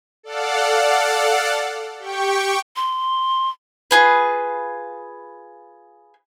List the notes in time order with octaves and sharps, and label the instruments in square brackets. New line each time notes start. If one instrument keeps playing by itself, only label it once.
[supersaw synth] A4 D5 F5 F#5
G4 G5 C#6
[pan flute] C6
[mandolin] F4 G#4 B4